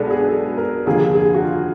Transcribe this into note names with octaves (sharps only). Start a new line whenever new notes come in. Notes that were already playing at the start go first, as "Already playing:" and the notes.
Already playing: B1 B2 G#3 B3 D4 G#4 A4
G#4
A4
A#4
F1 D#2 D3 F3 A#3 G#4
G#4
G#4
F#4
F4